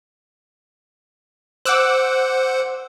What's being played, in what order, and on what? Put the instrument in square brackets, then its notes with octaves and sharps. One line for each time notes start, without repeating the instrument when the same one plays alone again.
[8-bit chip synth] C5 F#5 [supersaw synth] D6 E6 F#6